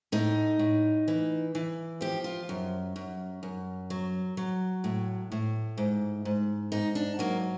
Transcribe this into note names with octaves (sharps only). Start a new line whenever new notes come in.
A2 D#4
A2
E3
E3
F3 G4
F4
F#2
F#2
F#2
F#3
F#3
A2
A2
G#2
G#2
G#2 D#4
D4
F#3 A#3